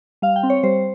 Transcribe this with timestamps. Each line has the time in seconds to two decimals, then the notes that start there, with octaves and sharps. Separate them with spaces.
0.22 G3 F5
0.36 G5
0.43 C4
0.50 C#5
0.63 G3 C5